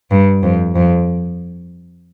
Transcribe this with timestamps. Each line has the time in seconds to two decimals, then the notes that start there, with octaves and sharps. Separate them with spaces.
0.11 G2
0.43 F2
0.75 F2